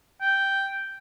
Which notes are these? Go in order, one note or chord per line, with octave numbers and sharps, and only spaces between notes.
G5